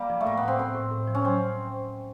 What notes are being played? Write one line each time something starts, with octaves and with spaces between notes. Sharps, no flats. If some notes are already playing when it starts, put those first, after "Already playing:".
Already playing: G3 A#3
F3
A3
A2 A#3
B3
F3
C4
A2 C4
A2
A2
F3
C#4
F#3 C4